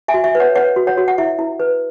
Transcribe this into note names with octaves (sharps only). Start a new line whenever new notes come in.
E5 G#5
F#4
E5
B4
C#5 F#5
B4 C#5 F#5
F#4
C#5 F#5
F#4
F#5
E4 E5
E4
B4